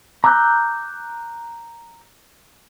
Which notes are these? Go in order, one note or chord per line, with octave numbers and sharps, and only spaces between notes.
A#5 D6 E6 F#6 G6